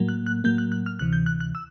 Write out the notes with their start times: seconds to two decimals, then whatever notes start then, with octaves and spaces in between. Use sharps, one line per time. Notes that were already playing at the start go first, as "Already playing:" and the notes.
Already playing: A2 F#3 A#3
0.08 F#6
0.26 F#6
0.44 A2 F#3 A#3 G6
0.58 F#6
0.72 F#6
0.86 F6
0.99 D2 C3 E3 F#6
1.13 G6
1.26 F#6
1.40 F#6
1.55 E6